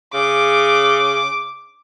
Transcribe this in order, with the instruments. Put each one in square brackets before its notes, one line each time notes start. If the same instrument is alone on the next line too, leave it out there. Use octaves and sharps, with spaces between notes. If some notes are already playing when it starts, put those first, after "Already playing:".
[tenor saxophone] C#3 [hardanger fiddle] D6